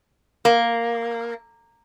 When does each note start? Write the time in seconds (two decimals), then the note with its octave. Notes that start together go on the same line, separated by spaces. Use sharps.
0.45 A#3